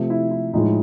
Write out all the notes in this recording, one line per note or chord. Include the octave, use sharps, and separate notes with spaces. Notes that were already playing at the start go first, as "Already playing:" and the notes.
Already playing: C3 F3 A3
E4
E4
A2 F3 G#3 D#4